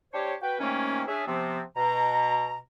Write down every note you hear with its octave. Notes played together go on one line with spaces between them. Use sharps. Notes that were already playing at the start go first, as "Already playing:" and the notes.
G3 D4 G4 C5 C#5
F#4 B4 G5
C3 D#3 A3 A#3 C#4
C#4 D4 G#4 E5
C3 F3 B3 C4
B2 A#5